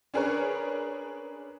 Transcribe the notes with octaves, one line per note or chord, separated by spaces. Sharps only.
C#4 D4 G#4 A#4 B4 C#5